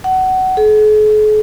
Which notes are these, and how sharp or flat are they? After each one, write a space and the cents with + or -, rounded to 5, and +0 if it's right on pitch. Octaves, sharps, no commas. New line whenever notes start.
F#5 +25
G#4 +45